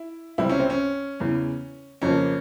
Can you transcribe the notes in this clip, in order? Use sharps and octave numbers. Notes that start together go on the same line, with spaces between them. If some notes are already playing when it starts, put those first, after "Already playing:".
Already playing: E4
C#2 C3 E3 G3 C4 E4
C#4
C4
C#4
E2 C#3 E3
F2 C#3 F3 A#3 C#4